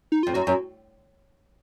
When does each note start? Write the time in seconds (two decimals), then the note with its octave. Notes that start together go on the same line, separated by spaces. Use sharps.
0.12 D#4
0.23 F2 F4
0.34 F#2 F#4
0.47 F#2